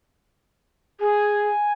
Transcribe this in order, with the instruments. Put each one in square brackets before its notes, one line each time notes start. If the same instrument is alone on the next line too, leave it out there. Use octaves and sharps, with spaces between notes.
[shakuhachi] G#4 [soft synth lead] G#5